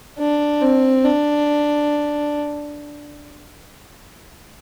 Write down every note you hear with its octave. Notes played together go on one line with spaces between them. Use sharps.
D4
C4
D4